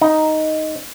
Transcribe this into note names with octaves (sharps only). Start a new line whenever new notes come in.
D#4